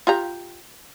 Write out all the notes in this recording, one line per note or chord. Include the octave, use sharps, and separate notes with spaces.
F4 G4 A#5